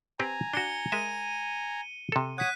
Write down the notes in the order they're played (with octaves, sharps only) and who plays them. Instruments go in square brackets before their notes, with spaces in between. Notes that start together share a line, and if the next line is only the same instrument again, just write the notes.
[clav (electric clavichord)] C4 G4 B4 [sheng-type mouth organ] G#5 A#5
[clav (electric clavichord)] D4 F#4 [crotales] C#7 G7
[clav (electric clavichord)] G#3 A#4 E5 [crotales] D#7
[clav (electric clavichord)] C3 A4
[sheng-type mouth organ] C#5 F#5 D#6 [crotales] F#6 B6 D#7